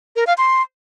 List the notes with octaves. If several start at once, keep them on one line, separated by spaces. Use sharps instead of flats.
A#4
F5
C6